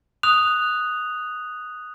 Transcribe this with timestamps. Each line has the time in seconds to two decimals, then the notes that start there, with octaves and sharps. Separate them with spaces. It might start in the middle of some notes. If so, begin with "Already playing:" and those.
0.23 D#6 F#6 F7